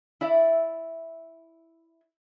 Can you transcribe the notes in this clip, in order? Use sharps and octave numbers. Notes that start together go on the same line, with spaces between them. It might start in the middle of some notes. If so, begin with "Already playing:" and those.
E4 D5 E5